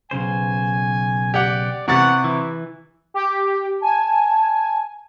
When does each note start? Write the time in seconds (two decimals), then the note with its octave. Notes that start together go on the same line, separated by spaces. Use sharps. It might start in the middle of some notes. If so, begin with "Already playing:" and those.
0.11 B1 C#3 C5 G#5
1.34 G4 D5 F#5
1.88 C3 E3 B3 F#5 C#6 A6
2.24 E3 E4
3.14 G4
3.82 G#5 A5